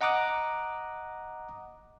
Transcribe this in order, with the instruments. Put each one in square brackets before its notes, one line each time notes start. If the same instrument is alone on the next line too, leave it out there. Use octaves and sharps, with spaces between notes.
[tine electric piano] D#5 F#5 A#5 D6 D#6 F#6